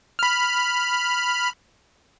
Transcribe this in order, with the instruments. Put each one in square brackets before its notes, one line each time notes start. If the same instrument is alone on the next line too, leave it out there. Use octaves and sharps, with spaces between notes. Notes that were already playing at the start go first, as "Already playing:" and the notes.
[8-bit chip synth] B5 F6